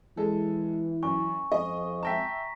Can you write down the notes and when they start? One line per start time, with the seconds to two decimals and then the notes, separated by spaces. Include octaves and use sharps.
0.17 E3 G#3 A4
1.03 F#2 G#5 C#6
1.52 F2 D#5
2.03 E5 G5 A5 A#5 A#6 B6